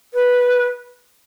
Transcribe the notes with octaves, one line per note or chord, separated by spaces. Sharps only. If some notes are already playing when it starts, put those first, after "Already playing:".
B4